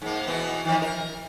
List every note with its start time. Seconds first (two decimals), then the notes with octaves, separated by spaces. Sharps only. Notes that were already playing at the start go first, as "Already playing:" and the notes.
0.02 G#2 A#3
0.27 B2 E3 B3
0.65 D#3 F3
0.82 A#4